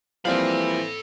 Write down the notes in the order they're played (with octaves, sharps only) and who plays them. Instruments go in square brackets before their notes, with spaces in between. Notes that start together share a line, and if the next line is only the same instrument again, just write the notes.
[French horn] E3 [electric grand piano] F3 G3 A#3 [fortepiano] C4 F5 [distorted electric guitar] A4 B5